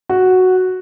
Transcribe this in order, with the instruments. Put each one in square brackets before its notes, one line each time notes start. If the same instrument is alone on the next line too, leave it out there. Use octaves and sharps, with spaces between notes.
[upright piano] F#4